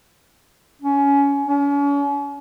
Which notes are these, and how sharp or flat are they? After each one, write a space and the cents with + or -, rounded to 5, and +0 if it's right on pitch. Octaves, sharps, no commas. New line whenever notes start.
C#4 +20
C#4 +40